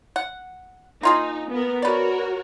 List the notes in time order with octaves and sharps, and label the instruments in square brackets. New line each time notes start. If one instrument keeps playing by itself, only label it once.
[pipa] F#5
[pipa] A#3 F4 G#4 [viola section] D#4
[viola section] B3 A#4
[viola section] F#4 A#4 C#5 [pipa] B4 D5